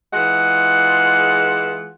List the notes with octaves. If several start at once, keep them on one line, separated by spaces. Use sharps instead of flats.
E3 G#3 F4 G#4 F#5